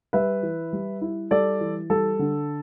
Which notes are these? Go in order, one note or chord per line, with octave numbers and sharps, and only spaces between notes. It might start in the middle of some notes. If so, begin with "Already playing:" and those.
G3 B4 E5
E3
G3
E4
G3 A4 D5
E3
G3 A4
D3